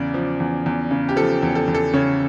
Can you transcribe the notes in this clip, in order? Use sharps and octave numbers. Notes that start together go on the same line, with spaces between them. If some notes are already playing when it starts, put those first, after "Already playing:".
Already playing: E2 C#3 D5
F3
E2
E2
C#3
G4
F3 A4
E2
A4
E2
A4
C#3 C#5